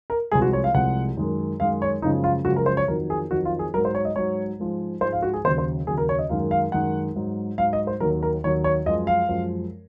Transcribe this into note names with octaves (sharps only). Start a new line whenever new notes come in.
A#4
C2 C3 F3 G#3 G#4
F#4
C#5
F5
C2 C3 F3 G#3 F#5
F#2 D#3 G#3
F#2 D#3 G#3 F5
C#5
F#2 C#3 F3 G#3 D#4
F4
F#2 C#3 F3 G#3 F#4
A#4
C5
C#5
F2 D#3 F#3 A#4
G#4
F2 D#3 F#3 F#4
F4
G#4
G#2 F#3 A#4
C5
C#5
D#5
G#2 F#3 C#5
G#2 F3 G#3
G#2 F3 G#3 C5
F5
F#4
G#4
D#2 C#3 F#3 C5
C5
D#2 C#3 F#3 G#4
A#4
C#5
D#5
F#2 D#3 G#3 F5
F5
F#2 D#3 G#3 F#5
G#2 F#3
G#2 F#3 F5
D#5
C5
D#2 D#3 F#3 A#4
A#4
D#2 D#3 F#3 C#5
C#5
F#2 F3 G#3 D#5
F5
F#2 F3 G#3